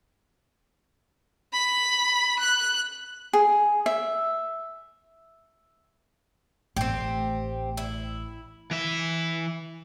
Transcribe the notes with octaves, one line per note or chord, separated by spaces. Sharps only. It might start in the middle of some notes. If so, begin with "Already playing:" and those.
B5
F#6
G#4
E5
A1 A3 C4 G4
E4
E3 E5